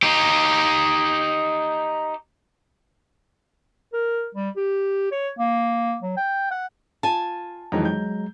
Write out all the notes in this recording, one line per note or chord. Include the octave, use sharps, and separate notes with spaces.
D#4 G4
A#4
G3
G4
C#5
A#3
F#3
G5
F#5
F4 G#5 A5
F2 D#3 E3 F#3 G#3 A#5
G6